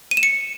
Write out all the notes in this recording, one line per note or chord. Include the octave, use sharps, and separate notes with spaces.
D#7
E7
C#7